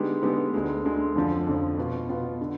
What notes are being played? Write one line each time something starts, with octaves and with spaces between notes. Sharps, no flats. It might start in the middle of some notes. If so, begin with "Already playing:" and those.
Already playing: D3 G#3 B3 D#4 G4
D3 G#3 B3 D#4 G4
D2 D3 G#3
D2 D3 G#3
F2 D3 F3
F2 D3 F3
B2 B3 F4
B2 B3 F4
D3